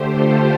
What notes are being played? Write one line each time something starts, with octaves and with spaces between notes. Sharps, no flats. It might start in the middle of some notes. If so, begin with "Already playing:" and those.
Already playing: D3 A3 G4 C5
F4 A4